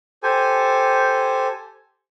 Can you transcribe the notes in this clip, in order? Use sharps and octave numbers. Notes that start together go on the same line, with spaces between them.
G4 A4 C5 G#5